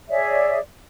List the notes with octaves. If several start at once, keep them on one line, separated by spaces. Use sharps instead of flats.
G#4 C#5 D5 E5